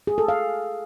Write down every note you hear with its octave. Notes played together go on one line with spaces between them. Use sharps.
G#4
A4
F5